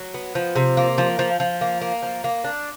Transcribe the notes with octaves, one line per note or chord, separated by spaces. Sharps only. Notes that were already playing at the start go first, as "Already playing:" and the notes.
Already playing: F#3
B3
F3
C3
A#3
F3
F3
F3
A#3
A#3
F3
A#3
D4